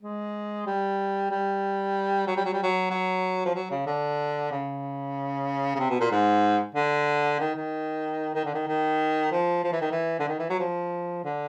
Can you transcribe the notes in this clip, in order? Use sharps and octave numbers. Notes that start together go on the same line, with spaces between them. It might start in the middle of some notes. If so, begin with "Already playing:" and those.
G#3
G3
G3
F#3
G3
F#3
G3
F#3
F#3
F3
F#3
C#3
D3
C#3
C#3
C3
B2
A#2
G#2
D3
D#3
D#3
D#3
D3
D#3
D#3
F3
F3
E3
D#3
E3
D3
D#3
E3
F#3
F3
D3